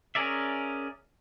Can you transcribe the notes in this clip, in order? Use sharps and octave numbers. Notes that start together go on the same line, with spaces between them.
C#4 G#4 A#4 D5 E5